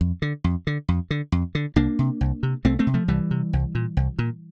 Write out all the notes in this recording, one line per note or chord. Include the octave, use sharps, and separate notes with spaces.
F2
D3
F2
D3
F2
D3
F2
D3
C2 A#3 D4
C3
C2
C3
C2 A3 C4
A3 C4
C3
F3 A3
C2 E3 G3
C3
C2
A#2
C2
A#2